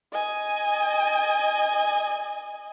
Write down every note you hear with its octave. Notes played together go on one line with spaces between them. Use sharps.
D#5 G#5